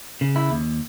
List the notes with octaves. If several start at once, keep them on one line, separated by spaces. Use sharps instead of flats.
C#3
E4
D#2